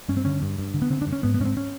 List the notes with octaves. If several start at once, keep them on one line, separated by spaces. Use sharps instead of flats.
G2 C#4
C4
D3 C#4
G2
G2
D3
B3
D3 C4
D4
G2
C#4
G#2 B3
B3
G#2 C#4
C4
C#4